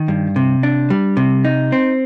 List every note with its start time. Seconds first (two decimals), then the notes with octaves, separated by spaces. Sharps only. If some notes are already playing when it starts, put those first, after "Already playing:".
Already playing: D#3
0.08 G2
0.36 C3
0.63 D4
0.90 G3
1.17 C3
1.45 D#4
1.72 C4